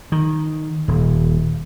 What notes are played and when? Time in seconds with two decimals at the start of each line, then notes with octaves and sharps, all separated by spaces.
0.12 D#3
0.88 D#1